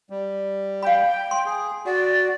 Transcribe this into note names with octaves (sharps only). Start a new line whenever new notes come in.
G3
F5 G5 B5
C6
G#4
F#4 D5